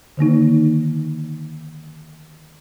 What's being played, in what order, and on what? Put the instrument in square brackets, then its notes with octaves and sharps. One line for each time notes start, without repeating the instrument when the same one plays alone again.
[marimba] D3 D#3 A#3 D#4